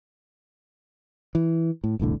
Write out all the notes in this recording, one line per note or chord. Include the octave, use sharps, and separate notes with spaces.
E3
A2
E1 C2 A2 D3